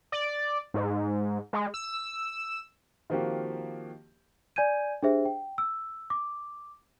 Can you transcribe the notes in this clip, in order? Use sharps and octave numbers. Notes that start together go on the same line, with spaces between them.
D5
G#2
G#3
E6
D#3 F3 A#3 C4 F#4 G4
D5 G#5 G6 G#6 D#7
D4 G4 G#4 C5 E5
G5
E6
D6